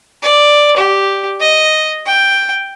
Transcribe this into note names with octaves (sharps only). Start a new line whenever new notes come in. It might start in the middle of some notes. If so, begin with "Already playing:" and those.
D5
G4
D#5
G5